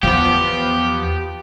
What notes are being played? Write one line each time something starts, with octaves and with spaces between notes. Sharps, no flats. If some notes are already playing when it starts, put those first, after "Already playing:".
E2 F3 B3 G4